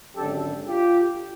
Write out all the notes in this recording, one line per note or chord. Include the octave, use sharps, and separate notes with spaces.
G#1 F#2 D3 G4 A4
F4 G4